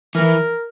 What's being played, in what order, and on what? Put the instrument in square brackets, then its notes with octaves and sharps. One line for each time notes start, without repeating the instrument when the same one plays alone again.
[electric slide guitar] E3 [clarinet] A#4